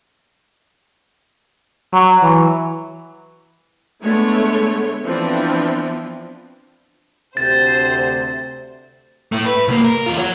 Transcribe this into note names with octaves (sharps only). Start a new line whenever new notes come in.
F#3
E3
D3 G#3 A3 B3 C#5
E3 F3 B3 C4 D4
D2 C3 C5 A6
A2 A3
B4
C2 A#3
A#4
E2 F4
C#5 F#5